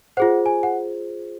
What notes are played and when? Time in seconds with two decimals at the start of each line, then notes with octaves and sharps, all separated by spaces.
0.17 F4 G#4 C5 F#5
0.46 G#5
0.63 F#5